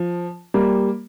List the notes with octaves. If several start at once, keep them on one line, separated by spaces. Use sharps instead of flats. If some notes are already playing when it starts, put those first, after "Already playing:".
Already playing: F3
G3 A#3